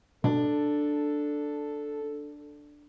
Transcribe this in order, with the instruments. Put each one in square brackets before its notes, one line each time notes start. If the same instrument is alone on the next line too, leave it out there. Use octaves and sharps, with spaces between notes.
[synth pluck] B2 [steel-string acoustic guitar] D4 [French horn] A4